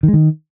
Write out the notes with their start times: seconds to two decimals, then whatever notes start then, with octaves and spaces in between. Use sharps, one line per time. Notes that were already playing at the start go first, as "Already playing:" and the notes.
0.03 D#3
0.08 G#3
0.14 D#3